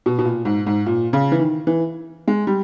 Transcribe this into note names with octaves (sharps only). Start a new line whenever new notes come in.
B2
B2
A#2
G#2
G#2
A#2
C#3
E3
D#3
E3
G#3
G3